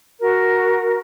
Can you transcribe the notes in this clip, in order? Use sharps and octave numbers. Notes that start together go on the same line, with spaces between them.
F#4 A#4